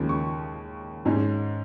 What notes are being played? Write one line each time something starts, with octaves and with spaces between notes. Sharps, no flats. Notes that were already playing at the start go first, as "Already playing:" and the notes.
Already playing: D#2 C#3 F3 G#3 C#4
C#6
G#2 G#3 C#4